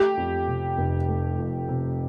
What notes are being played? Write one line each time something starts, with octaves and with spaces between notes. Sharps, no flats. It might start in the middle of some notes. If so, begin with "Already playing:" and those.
Already playing: A3 G4
F2
C3
F1
A3
F2
C3